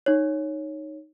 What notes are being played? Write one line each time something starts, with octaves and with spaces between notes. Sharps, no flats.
D#4 C#5